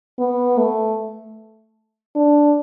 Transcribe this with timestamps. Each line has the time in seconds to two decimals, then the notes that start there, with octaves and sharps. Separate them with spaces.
0.19 B3
0.58 A3
2.16 D4